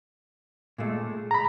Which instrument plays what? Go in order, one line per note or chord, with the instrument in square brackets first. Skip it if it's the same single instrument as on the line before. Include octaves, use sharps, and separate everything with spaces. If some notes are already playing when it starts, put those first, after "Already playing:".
[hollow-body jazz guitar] A#2 G#3 A3
[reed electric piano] A#5 B5